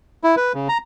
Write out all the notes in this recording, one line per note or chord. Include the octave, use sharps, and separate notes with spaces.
E4
B4
C#3
A#5